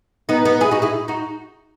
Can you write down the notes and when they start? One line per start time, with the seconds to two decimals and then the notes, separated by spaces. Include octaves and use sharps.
0.29 B3 D#4
0.45 B3 D#4
0.61 E4 G#4
0.71 D#4 F#4
0.82 E4 G#4
1.08 D#4 F#4